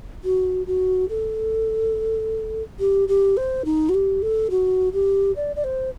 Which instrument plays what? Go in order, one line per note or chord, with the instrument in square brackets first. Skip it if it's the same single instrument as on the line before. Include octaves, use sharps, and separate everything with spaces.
[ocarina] F#4
F#4
A4
G4
G4
C5
D#4
F#4
G4
A4
F#4
G4
D5
D5
C5